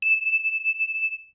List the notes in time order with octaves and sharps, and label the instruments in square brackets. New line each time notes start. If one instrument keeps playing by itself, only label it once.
[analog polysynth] E7